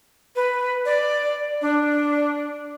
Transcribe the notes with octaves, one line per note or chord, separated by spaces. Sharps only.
B4
D5
D4